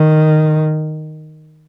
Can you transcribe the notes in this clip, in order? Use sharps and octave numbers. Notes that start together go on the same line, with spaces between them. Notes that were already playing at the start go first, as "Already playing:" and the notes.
Already playing: D#3